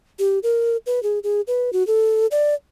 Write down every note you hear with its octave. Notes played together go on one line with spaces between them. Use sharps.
G4
A#4
B4
G#4
G#4
B4
F#4
A4
D5